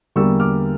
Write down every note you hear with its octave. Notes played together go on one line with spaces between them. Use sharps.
E2 D3 G3 A#3 C#6 E6
D6 F6